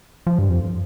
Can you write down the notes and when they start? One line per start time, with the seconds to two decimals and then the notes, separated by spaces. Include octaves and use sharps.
0.27 F3
0.39 G2
0.49 F2